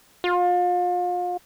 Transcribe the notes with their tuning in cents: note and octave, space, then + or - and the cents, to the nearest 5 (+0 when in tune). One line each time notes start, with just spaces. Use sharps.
F4 +35